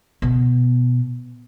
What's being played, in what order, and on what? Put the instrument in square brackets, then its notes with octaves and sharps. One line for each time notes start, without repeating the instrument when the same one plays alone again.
[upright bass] B2